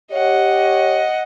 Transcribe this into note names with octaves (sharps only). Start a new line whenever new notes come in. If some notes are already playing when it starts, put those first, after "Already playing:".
G4 C#5 D#5 F#5